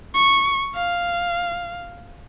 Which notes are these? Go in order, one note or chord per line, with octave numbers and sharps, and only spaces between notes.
C#6
F5